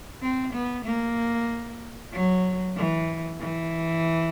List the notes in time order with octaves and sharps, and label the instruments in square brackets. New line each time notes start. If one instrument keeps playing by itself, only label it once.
[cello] C4
B3
A#3
F#3
E3
E3